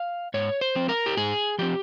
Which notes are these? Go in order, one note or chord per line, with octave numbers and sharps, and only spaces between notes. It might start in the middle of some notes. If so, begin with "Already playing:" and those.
Already playing: F5
G#2 C#5
C5
F3 C4
A#4
G4
G#2 G#4
F3 C4 G4